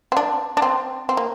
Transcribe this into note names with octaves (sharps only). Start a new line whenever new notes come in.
C4
D4
D4
C4
C4
A#3